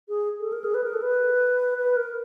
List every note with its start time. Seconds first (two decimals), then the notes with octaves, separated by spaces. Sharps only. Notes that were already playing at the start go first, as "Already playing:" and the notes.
0.09 G#4
0.40 A4
0.52 A#4
0.64 G#4
0.74 B4
0.84 A#4
0.94 A4
1.02 B4
1.78 B4
1.96 A#4